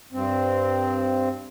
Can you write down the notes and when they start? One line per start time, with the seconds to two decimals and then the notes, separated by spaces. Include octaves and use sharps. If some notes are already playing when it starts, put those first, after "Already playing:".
0.13 G2 C4